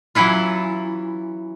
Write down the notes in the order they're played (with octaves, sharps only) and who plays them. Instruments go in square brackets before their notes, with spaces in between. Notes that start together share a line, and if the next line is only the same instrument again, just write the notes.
[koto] E3 F#3 C#4 E4 F4